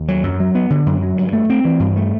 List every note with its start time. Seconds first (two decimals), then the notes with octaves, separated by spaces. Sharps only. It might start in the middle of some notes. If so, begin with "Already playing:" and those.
Already playing: D#2
0.08 F#3
0.24 F#2
0.40 F#3
0.55 B3
0.70 D3
0.86 F#2
1.02 F#3
1.17 G2
1.33 A3
1.50 C4
1.65 E3
1.80 G2
1.96 A3